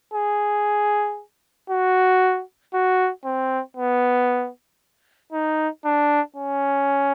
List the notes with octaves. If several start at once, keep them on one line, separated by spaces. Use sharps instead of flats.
G#4
F#4
F#4
C4
B3
D#4
D4
C#4